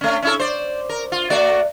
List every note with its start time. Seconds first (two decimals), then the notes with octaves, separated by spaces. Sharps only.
0.01 A3 C#4
0.22 C#4 E4 A4
0.40 C5 D5
0.89 A#4
1.12 F4
1.30 A3 F#4 D5